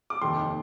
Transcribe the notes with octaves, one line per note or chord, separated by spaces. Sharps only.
D6
F1 D#2 D#3 C6